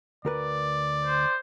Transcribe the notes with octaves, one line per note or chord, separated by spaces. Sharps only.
D2 A#4 B4 D5
C5